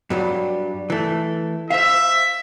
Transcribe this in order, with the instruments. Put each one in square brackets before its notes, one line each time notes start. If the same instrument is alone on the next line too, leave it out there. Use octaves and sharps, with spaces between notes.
[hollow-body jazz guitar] G2 F#3 G3
E3 A3
[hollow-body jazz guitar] C5 F5 [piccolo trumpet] E5